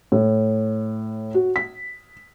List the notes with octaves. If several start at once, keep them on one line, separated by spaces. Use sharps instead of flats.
A2
F#4
B6